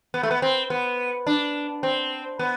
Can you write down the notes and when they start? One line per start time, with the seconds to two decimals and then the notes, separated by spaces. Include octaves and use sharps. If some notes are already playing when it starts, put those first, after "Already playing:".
0.14 B3
0.23 A3
0.31 B3
0.42 C4
0.70 B3
1.27 D4
1.83 C4
2.39 B3